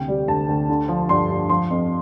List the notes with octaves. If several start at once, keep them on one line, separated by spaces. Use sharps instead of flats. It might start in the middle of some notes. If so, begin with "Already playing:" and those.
Already playing: D2 C3 G5
G3
D2 A5
D2
D3
F3
G2 C6
G2
F3 C6
F2